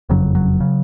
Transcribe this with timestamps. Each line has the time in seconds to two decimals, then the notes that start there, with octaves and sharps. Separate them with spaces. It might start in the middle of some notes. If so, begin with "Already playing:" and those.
0.10 F#1 F2 C#3 F#3
0.35 F#3
0.61 C#3